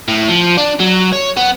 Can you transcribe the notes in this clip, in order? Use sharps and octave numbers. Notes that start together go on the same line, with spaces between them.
A2
F3
D4
F#3
C#5
B3